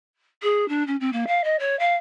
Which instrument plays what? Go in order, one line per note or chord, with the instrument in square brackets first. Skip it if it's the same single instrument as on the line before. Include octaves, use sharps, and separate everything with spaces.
[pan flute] G#4
D4
C#4
C4
A#3
F5
D#5
C#5
F5